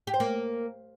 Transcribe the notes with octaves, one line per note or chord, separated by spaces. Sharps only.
G4
C5
A#3